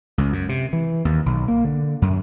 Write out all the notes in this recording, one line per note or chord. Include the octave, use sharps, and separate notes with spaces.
C#2
F#2
C3
E3
D#2
B1
A#3
D3
F#2